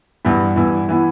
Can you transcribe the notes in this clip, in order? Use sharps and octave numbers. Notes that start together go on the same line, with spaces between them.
G2 E3 B3 E4
G2 E3 B3 E4
E3 B3 E4